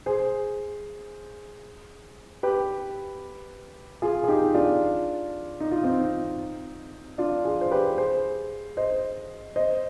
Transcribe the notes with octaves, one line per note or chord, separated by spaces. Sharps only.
G#4 C5
G4 B4
F4 G#4
G#4
D#4 G4
D4 F4
D#4
F4
C4 D#4
D4 F4
F4 G#4
C5
G4 B4
G#4 C5
C5 D#5
C5 D#5